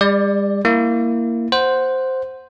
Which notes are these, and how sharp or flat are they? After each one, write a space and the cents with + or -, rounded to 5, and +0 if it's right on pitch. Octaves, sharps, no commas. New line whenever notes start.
G3 +45 D5 +5
A#3 -5 E4 +5
C5 +0 F#5 +0